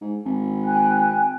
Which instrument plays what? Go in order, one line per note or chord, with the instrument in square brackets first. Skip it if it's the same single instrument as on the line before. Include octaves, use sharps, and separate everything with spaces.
[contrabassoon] G#2
G#1
[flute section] G5 G#5 F#6